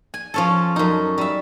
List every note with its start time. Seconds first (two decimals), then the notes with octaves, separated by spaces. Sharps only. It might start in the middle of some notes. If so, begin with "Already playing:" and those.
0.14 G#5
0.34 F3 C#4 A4
0.76 F#2 D#4
1.18 G3 E5